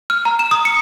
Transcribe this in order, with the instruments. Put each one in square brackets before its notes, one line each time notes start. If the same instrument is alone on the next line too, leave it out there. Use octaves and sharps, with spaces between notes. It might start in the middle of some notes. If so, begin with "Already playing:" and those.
[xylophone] F6
A#5
E7
D#6
C#7